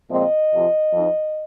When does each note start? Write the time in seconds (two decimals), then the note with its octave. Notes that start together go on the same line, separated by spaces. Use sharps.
0.11 A#2 F3 G#3 C4 D#5
0.52 F2 C3 F3
0.93 F2 F3 C4 D#4